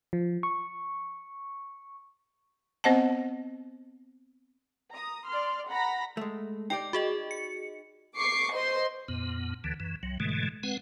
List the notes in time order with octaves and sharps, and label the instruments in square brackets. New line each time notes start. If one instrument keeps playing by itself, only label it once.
[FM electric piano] F3
C#6
[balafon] B3 C4 C5 D#5 F#5 A5
[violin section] A#5 D#6
D5 C6 F6
F#5 A#5 B5 A#6 B6
[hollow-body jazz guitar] G#3 A3
[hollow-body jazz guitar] D#4 G4 D5 [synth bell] G5
[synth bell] F#4 G#4 D#5
C#7
[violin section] C#6 D6 C7
C5 D#5 C6
[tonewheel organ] F2 A#2 B3
D2 D3 E3
F#2 E3
C2 F#3
G#2 B2 D3 E3 G#3 A3
G#3 C4 B4 F#5